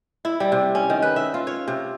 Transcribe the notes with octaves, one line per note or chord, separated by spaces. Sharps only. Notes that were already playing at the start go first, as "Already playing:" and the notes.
E4
G3
C3
C#4
D#3
B4
E5
F4
C#5
C3